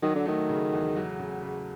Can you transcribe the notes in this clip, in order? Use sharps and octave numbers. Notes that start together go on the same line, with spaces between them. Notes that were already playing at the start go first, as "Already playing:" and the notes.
D#3 F#3
D3
D#3 A3
C#3
E2
F#3
C#3
C#3